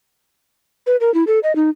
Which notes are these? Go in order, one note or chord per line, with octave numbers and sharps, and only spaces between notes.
B4
A#4
E4
A4
D#5
D#4